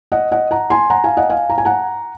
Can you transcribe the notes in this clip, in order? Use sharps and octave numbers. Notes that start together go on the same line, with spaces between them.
D#5 F#5
D#5 F#5
F#5 A#5
G#5 C6
F#5 A#5
F5 G#5
D#5 F#5
F5 G#5
A#5
G#5
F#5 A#5